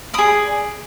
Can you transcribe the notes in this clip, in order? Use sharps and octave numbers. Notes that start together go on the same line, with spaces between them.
G#4 D5 B5 D#6